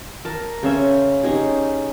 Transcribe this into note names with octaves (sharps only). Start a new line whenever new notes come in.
A#4 A5
C#3 C#4 C5 E5
C#4 D#4 G4 G#4